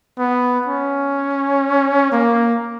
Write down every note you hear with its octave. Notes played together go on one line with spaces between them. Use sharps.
B3
C#4
A#3